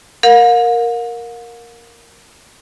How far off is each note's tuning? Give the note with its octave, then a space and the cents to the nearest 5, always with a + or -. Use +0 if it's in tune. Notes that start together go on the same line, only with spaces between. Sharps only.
A#4 +0 F5 +45